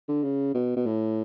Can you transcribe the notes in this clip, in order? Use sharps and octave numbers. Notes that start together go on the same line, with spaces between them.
D3
C#3
B2
B2
A2